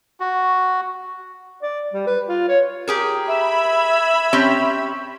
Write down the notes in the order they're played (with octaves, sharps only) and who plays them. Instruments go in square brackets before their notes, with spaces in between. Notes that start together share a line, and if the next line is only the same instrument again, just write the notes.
[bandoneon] F#4
[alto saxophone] D5
G3
B4
F4
C#5
[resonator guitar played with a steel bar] G4 G#4 A#4
[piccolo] E5 [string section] B5 G#6
[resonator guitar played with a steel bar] C4 C#4 G4